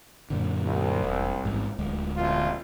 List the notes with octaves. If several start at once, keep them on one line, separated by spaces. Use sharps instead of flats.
F#2 A#2 D3
C2
E1
A1 G#2
D1 D2 G#3
A1 B2 F4